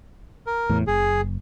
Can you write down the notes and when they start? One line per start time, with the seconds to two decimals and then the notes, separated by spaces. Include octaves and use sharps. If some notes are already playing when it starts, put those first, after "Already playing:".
0.46 A#4
0.69 E2 A2
0.87 F#1 G#4